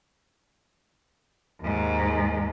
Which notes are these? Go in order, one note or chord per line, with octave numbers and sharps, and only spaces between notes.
D#2 G#2